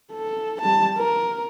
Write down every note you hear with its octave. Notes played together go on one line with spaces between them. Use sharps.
A4
G3 A5
A#4